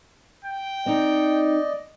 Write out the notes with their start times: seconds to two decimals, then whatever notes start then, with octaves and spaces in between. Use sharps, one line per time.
0.45 G5
0.86 C4 D#4 D5 D#5